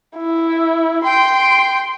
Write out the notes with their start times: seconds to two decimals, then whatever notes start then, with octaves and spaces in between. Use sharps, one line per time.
0.16 E4
1.04 G5 C6